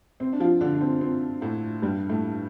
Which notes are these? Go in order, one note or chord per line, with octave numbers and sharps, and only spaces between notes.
C3 C4
D4
F3 F4
D3 D4
D4
C3 C4
C3 C4
A2 A3
G2 G3
A2 A3